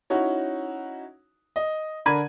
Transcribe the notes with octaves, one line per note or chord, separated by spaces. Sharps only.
C#4 D#4 E4 F#4
D#5
D3 D4 A#4 B5 G#6 D#7